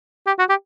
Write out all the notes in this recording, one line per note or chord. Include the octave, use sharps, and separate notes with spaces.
G4
F#4
G4